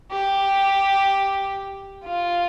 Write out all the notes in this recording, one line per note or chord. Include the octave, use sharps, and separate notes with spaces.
G4
F4